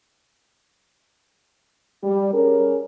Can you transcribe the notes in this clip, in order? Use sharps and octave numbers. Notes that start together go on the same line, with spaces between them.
G3
C#4 G#4 A#4